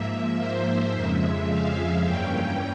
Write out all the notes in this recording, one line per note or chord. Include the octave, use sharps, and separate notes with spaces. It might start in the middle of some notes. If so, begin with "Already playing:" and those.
Already playing: G#2 F3 A#3 E5
C5
F2 C#3 F3 G#3 E5
F5
G2 E3 G3 A#3 C#4 G5